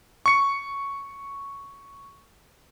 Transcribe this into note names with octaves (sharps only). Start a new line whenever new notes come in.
C#6 C#7